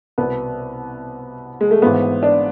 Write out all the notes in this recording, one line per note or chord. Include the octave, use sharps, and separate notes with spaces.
C2 B3
B2
G#3
A3
G#1 G#2 E3 B3
D4